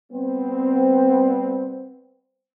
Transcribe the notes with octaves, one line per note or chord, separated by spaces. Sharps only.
G3 B3 C4